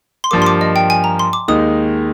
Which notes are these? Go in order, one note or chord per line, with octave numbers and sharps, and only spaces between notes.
C6
G2 F3 A#3 D6
C6
D6
D#5
G5
G#5
A#5
C6
D6
D#2 D#3 G#3 D#4 D#6